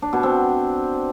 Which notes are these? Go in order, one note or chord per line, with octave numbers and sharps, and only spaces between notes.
D4
B2
C4